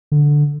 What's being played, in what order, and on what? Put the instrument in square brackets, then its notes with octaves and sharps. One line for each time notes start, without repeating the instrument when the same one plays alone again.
[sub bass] D3